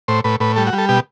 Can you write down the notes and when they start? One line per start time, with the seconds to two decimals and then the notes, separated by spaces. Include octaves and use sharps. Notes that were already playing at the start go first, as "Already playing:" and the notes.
0.08 A2 C5
0.24 A2 B4
0.40 A2 B4
0.56 G3 A4
0.67 F#4
0.73 G3
0.78 A4
0.89 B2 G4